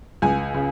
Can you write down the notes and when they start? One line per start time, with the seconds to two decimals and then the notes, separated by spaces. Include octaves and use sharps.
0.22 C#2 G#5
0.54 C#3